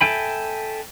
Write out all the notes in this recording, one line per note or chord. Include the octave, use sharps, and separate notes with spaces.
A4 E5 G5 G#5 B5